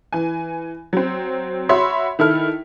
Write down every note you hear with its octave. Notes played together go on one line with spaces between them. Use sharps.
E3 G#5
F#3 C4
F#4 C#5 E5 B5 C6
D#3 E4 A4 F6